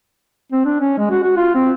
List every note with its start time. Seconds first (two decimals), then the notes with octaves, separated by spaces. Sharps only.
0.52 C4
0.65 D4
0.80 C#4
0.98 G#3
1.10 F#4
1.23 F#4
1.37 F4
1.55 C4